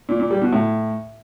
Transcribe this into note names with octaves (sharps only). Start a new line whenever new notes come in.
A#2
A#2
G3
B2
A2